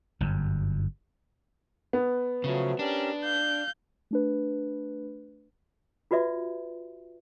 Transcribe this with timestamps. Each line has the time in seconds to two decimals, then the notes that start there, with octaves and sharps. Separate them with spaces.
0.21 G1 F#2
1.93 B3
2.44 C#3 F3 F#3 A3
2.79 C#4 D4 G4 A#4
3.24 F5 G6
4.11 A3 D4 B4
6.11 F4 F#4 B4 D5 E5